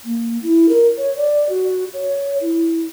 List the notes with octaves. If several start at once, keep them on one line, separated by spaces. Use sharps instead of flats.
A#3
E4
A#4
C#5
D5
F#4
C#5
E4